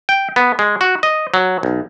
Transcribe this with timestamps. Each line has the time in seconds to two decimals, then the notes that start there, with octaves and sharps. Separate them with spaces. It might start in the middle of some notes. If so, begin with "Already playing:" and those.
0.09 G5
0.36 B3
0.59 G#3
0.81 F#4
1.03 D#5
1.34 F#3
1.63 B1